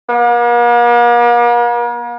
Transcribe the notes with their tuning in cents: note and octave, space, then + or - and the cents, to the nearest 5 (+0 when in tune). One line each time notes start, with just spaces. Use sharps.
A#3 +45